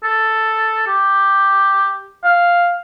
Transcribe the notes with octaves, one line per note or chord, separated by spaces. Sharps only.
A4
G4
F5